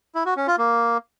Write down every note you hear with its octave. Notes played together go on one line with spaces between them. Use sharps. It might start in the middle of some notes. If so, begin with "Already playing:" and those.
E4
F#4
C#4
F4
A#3